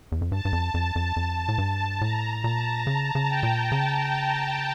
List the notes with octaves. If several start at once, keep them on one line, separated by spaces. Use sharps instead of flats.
E2
F2
G2 A5
G2
F2
F2
F2
F2
A2
G2
A2 A#5
A#2 A5
C#3 A5
C#3
G5
A#2
C#3